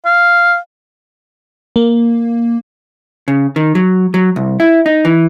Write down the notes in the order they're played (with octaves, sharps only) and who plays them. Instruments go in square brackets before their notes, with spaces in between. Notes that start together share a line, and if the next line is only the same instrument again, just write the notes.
[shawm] F5
[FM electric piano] A#3
[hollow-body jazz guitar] C#3
D#3
F#3
F#3
C2
E4
D#4
E3